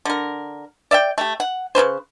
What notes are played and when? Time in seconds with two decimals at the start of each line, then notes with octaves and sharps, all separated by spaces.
0.05 D3 A#4
0.91 D5 E5 F5 G5
1.18 A3 G4
1.40 F#5
1.75 C#3 D4 B4 C5